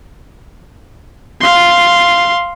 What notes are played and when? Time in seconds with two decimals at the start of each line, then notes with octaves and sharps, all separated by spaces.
1.40 F5 C6